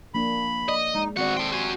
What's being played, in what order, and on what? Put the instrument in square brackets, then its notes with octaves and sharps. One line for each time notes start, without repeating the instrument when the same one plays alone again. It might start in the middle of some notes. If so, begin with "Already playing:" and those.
[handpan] F3 A#3 D4 [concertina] B5
[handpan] D5 [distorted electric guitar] D#5
[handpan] G#3 [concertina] D#4
[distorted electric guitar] G2 F#5 [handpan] D#3 C4 D5 [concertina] F#4
[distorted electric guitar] A3 G5 [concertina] C6
[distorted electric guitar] F#4 G#5 [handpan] G4